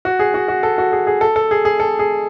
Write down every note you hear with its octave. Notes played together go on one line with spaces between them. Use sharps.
F#4
G#4
F#4
F#4
A4
F#4
G#4
G#4
A4
A4
G#4
G#4
A4
G#4